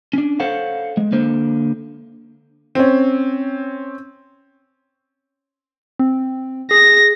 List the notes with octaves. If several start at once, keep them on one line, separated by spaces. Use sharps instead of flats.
C#4 D4
A4 C5 C#5 F5 F#5
G#3
D3 A#3 C5
C4 C#4
C4
G#4 A#6